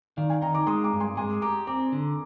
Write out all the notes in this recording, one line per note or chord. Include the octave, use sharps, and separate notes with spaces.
D#3 D5 F5
F5 G#5
D#4 G5 A#5
A#5 D6
G#3 C6 D#6
A#5 D6
G2
G#5 C6
G#3 G#5 C6
G4 A#5 D6
C4 A#5 D6
D3